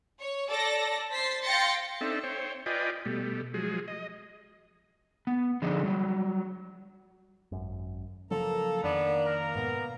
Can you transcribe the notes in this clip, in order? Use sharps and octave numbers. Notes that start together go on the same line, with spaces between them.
C#5
A4 D5 A#6
C5 A6 B6 C7
F5 G5 C6 A6 A#6 C#7
C4 D4 D#4 A4 E5
C5 C#5 G5
F4 B4 D5 D#5 G5 G#5
B2 G3 A3
F3 F#3 G#3 G#4
D#5
B3
D3 F3 D#4 G#4 D5
F#3 G3
G#1 F#2
C#3 F3 F#3 A#3 A4 A#5
F2 D#3 B3 D4
A#4
G#2 B2 B3